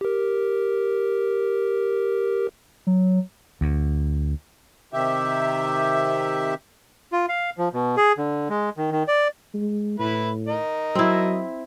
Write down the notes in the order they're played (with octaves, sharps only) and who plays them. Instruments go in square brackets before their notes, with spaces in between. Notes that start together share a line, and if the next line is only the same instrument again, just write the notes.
[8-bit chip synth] G4 A#4
[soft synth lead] F#3
[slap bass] D2
[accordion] C3 D#3 G4 E5
[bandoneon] F4
F5
F3
B2
G#4
D3
G#3
D#3
D#3
D5
[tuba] G#3
[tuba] A2 [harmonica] E4 B4
[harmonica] A#4 D#5
[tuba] F#3 [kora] C4 E4